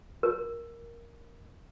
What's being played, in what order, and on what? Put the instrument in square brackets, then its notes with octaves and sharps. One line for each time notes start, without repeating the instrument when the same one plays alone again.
[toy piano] A#4